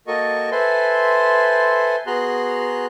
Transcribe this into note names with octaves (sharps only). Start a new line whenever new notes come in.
A#3 F#4 A4 A#4 D#5 C#6
A4 B4 C5 E5 G#5 C6
B3 F#4 G#4 A#5 C6 F#6